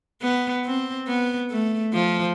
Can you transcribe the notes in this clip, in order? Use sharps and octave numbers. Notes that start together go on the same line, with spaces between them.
B3
C4
B3
A3
F3